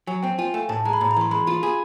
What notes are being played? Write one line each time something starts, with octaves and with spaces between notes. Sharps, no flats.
F#3 G#5
C4 G5
F4 G#5
A3 G#5
A2 A5
G#3 A#5
B5
A2 A#5
A#5
E3 C6
G#3 B5
F4 C6
G#4 B5